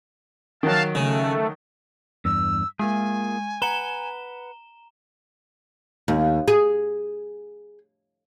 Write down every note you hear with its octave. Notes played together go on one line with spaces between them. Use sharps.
D#3 F#3 F5 A5
C#3 A3
E2 G2 E6
G#3 A#3 F4 G#4 G#5
B4 F#5 A#5 E7 G7
D#2
G#4